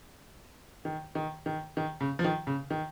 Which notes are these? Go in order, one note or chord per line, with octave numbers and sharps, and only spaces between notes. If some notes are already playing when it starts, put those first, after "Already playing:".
D#3
D#3
D#3
D#3
C#3
F3
D#3
C#3
D#3